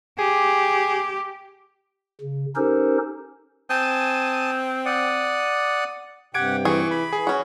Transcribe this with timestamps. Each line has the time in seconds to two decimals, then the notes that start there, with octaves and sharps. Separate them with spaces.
0.19 G4 G#4
2.21 C#3
2.56 C#4 D#4 G4 A4 A#4 C5
3.70 C4 G#5 A5 D#6
4.86 D5 F#5 D#6
6.34 G2 C3 G4 F#5 G5 G#6 D7
6.65 E3 G#4 C#6
6.91 B5
7.13 E3 G#4
7.27 C#4 F#4